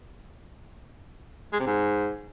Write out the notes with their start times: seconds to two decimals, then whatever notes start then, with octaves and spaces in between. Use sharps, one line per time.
1.53 G#3
1.60 C3
1.67 G#2